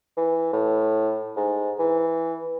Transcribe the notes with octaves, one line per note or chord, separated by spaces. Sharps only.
E3
A2
G#2
E3